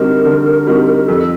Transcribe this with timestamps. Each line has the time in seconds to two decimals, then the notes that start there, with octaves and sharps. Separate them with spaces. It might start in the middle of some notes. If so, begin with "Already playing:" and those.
Already playing: D3 G3 C4 D#4 F#4 A#4
0.25 D3
0.67 G3 C4 D#4 F#4
1.08 F2 A4